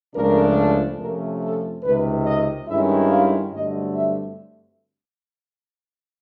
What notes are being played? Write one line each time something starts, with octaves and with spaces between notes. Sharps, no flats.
C#2 C#3 F3 A3 D4 A#4
F2 C3 F3 A3 C#4 A#4
A4
C#2 C3 D#3 B4
D#5
G2 D#3 G#3 C#4 E4 E5
F5
G2 D3 F#3 A3 C4 D#5
E5